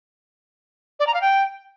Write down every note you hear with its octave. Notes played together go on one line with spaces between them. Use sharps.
D5
A#5
F5
G5